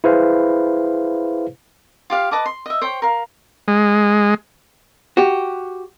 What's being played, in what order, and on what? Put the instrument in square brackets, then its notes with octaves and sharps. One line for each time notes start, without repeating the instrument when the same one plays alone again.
[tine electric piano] E4 G#4 B4 C5 F5
[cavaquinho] F4 G4 F5
B4 D#5 A5 D6
C6
D#5 E5
C5 C#5 G5
A#4 F5
[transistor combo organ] G#3
[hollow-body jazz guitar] F#4 G4